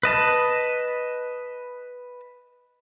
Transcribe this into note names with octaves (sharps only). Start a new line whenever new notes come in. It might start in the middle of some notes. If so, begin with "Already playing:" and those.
B4 D#5 A5